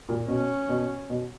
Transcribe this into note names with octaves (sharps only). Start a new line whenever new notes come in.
A#2
B2 C#4
B2
B2